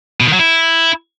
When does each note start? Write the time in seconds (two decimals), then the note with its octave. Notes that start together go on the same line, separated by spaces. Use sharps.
0.20 B2
0.27 D#3
0.33 F#3
0.39 E4